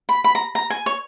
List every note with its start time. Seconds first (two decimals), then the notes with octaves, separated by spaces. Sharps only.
0.09 B5
0.24 B5
0.35 A#5
0.55 A#5
0.70 G#5
0.86 C#5